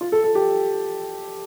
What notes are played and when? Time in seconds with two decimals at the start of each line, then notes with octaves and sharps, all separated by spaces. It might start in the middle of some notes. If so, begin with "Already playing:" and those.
0.01 F4
0.12 A4
0.24 A4
0.35 G4